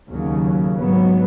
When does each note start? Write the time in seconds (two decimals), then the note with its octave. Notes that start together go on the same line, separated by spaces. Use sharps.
0.10 D#2 C#3 F#3
0.77 G#2 F#3 B3